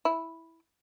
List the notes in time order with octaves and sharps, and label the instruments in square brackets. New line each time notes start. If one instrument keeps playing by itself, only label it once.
[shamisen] E4